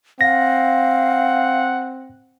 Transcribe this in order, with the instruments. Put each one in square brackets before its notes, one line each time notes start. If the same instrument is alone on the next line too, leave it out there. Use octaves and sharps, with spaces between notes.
[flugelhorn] C4 [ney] F5 [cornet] F#5 [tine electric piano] A#6